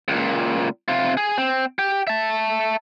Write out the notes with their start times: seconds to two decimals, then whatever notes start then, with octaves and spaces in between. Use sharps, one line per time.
0.08 C#2 A#2
0.88 C3 F4
1.17 G#4
1.38 C4
1.79 G4
2.07 E5 A5